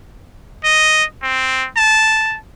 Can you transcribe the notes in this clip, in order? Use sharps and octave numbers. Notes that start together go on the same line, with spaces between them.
D#5
C4
A5